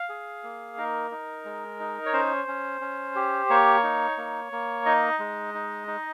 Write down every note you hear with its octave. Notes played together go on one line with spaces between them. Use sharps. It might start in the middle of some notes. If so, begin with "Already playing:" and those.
Already playing: F5
G#4
A#3
D#4 A#4
D#4
G#3
D#4
C#5
C#4 C5
C#4
C#4
G4
A#3 C#5
D#4
A#3
A#3
D#4 D#5
G#3
D#4
D#4